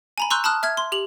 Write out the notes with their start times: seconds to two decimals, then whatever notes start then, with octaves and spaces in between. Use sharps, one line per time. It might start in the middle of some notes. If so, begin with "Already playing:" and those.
0.18 G#5 A#5 B5
0.30 A#5 C6 C#6 E6 F#6 G6
0.44 A5 B5 D#6 F6 F#6
0.63 E5 F6 G#6
0.77 C6
0.92 G4 F7 F#7